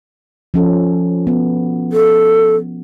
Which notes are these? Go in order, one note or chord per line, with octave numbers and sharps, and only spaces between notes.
F3 C#4 A4
B3
A4